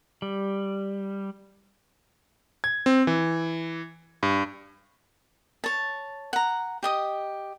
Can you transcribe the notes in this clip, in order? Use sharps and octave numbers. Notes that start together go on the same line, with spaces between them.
G3
G#6
C4
E3
G2
C#5 A5
F#5 A#5
G4 D#5 D#6